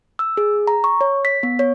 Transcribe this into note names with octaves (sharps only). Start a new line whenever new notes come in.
E6
G#4
A#5
C#6
C#5
B6
B3
C#5